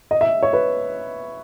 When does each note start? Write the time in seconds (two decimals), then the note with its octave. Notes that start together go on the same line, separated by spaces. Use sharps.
0.11 D#5
0.21 E5
0.43 C#5
0.53 B4